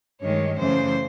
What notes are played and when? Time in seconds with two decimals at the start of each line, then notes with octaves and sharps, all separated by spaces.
0.20 G2 D#3 G#3 C#5
0.57 F#2 C#3 E3 A3 C5